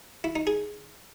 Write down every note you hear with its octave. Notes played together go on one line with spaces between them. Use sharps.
E4
D#4
G#4